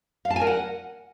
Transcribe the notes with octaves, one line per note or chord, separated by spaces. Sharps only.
F5
A5
G#5
A#4
F#5